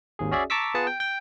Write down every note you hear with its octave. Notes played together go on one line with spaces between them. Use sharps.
G#1 D#2 G#4
C#4 F#4 G#4 D5 E5
A5 A#5 C#6 D6 E6 B6
B3 F4 G#4 B4 F#5 A5
G5
G5